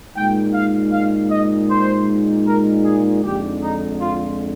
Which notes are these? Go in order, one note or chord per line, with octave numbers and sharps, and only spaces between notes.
A#2 G#3 D#4 G5
F5
F5
D#5
C5
A#4
G#4
F2 D3 G#3 D#4 G4
D#4
F4